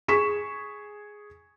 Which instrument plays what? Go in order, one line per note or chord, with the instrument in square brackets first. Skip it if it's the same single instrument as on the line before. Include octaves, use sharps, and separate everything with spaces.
[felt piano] G#4 C#6 B6 E7